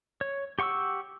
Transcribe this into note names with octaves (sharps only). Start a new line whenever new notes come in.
C#5
G4 F#5 C#6 D6 E6